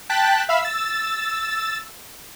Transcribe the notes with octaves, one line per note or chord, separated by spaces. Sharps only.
G5 A5 F#6 A6 B6
E5 F5 B5 E6 B6
E6 A6